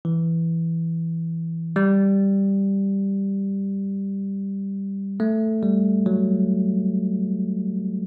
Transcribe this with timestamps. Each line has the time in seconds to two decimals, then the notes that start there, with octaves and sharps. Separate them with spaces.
0.05 E3
1.76 G3
5.20 A3
5.63 G3
6.06 F#3